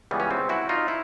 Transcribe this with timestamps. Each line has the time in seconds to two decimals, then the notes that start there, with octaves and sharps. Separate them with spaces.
0.11 C#2 C#3 E3 G3 B3
0.20 C#4
0.31 C4
0.49 E4 F#4
0.69 D#4 F4
0.88 E4